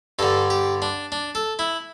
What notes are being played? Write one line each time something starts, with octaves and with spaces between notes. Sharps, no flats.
G2 D3 A4
G4
D4
D4
A4
E4